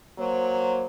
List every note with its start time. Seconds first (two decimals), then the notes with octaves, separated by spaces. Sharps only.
0.19 F#3 A#3 C5